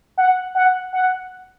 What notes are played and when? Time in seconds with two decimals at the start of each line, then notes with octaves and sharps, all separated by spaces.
0.18 F#5
0.55 F#5
0.93 F#5